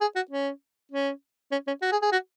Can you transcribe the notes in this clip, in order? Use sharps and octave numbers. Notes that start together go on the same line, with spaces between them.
G#4
F#4
C#4
C#4
C#4
C#4
F#4
G#4
G#4
F#4